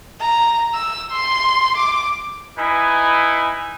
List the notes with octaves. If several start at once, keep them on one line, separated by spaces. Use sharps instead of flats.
A#5
E6
C6
D6
D#4 E4 B4 G#5